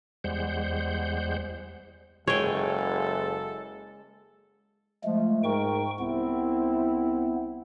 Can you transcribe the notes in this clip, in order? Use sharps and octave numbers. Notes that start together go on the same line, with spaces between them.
E2 G3 G#3 C5 F#5 G6
F#1 G#3 A4 C#5 G5
F3 G#3 A3
G#2 A#4 G5 C#6
C2 B3 C4 E4